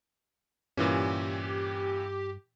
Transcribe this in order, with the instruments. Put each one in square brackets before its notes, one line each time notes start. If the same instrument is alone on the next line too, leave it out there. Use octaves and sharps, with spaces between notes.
[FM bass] G2 [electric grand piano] A#2 E3 C#4 [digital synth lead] G4